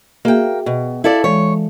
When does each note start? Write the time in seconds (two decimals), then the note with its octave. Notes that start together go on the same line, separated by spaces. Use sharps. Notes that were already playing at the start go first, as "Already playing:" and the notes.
0.25 A#3 F#4 G#4 E5 G5
0.66 B2
1.04 E4 A4 D5 F5 A6
1.24 E3 G#3 C#5